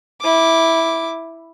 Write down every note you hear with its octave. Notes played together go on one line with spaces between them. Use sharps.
E4 D6